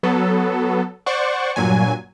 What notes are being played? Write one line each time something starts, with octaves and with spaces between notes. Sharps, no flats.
F#3 B3 A4
C5 D5 F#5 C#6
G2 A#2 F#3 G#5